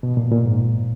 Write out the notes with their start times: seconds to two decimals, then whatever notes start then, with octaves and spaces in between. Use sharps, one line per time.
0.03 B2
0.17 A#2
0.31 A#2
0.45 G#2